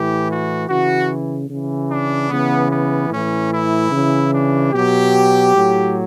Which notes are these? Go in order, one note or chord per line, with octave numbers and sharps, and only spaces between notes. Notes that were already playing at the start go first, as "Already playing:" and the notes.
Already playing: A2 E3 G4
F#4
C#3 E3 F#4
C#3 E3
D4
C#3 E3 B3
B3
A2 E3 C#4
E4
C#3 E3
D4
B2 F#3 G4
A2 F#3